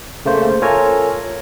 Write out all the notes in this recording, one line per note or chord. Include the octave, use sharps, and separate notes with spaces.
C#3 A3 A#3 C5
F4 A4 A#4 C#5 G#5 A#5